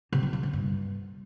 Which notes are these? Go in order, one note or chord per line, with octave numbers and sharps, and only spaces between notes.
C3
F3
F3
D3
G2